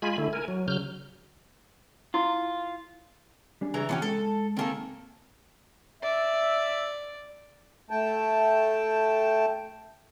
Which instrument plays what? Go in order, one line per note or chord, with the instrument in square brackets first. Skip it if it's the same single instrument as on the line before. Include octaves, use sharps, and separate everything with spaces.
[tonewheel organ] G#3 F4 G#5 B5
D3 A3 E4
A#4 G#5
F#3
C#3 F#3 F6 G6
[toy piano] E4 C6 [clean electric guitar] F4
[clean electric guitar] G3 D4 G#4
[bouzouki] C#3 E3 A#5
[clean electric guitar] B2 E3 F3 [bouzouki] B3 C#4 G4
[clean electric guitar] G#3 [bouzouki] A4
[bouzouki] D#3 A#3 A4 [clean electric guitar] C4 G#4
[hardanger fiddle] D5 [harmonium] E5
[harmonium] A3 G5 A5